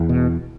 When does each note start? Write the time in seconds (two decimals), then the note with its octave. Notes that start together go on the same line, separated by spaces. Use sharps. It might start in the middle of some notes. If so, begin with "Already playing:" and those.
Already playing: E2
0.09 B2